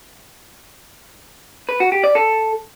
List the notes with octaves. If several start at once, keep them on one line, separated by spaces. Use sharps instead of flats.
B4
F#4
G4
D5
A4